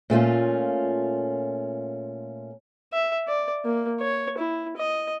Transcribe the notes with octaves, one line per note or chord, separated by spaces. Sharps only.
A#2 A3 C#4 F4
E5
D5
A#3
C#5
E4
D#5